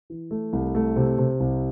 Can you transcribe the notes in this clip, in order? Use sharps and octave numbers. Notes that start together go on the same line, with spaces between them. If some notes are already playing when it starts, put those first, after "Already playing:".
E3
A3
C2
A3
C3
C3
C2